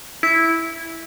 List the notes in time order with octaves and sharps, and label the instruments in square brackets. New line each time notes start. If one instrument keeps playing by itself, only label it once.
[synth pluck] E4